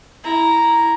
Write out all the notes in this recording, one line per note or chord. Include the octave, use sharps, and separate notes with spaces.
E4 A#5